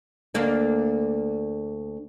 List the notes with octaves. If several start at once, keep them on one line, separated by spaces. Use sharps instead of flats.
D2 A#3 D4